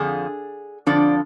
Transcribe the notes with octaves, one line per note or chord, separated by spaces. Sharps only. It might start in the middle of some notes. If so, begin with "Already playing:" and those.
Already playing: F2 D3 F3 G#4
F2 D3 F3 D4 D5